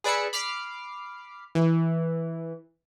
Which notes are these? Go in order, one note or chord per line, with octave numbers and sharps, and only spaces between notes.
G#4 B4 D5 B5 E6 C#7
B5 D6 F6 C7
E3